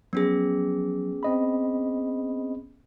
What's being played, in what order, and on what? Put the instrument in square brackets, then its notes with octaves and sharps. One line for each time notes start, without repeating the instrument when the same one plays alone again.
[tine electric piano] F3 F#3 [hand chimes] B3 C#4 G#4
[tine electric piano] C4 D#5 B5